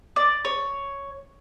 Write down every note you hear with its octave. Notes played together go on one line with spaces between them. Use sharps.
D5
C#5